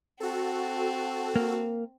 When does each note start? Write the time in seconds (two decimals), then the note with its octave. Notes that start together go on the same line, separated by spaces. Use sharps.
0.20 C4 F#4 A4
1.36 A#3